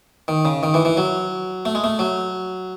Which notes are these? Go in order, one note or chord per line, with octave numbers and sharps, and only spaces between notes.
D#3
C#3
D#3
E3
E3
F#3
A3
G#3
A3
F#3